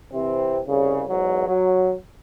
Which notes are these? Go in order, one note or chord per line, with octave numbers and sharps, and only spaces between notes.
C3 E3 C4
C2 C#3
E2 G#2 F#3
F#3